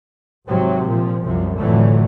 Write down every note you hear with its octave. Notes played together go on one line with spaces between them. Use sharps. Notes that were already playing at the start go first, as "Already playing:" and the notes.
G#1 G#2 C3 F#3
A#2 F3
C2 F#2 C3 F3
F1 A2 D3 E3 F#3 A3